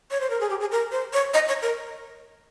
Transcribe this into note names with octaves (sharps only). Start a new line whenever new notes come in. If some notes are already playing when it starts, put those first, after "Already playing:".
C#5
C5
A#4
G#4
G4
G#4
A#4
C5
C#5
D#5
C#5
A#4